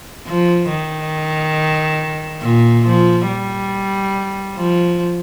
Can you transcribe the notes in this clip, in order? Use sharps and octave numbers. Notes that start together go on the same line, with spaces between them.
F3
D#3
A#2
F3
G3
F3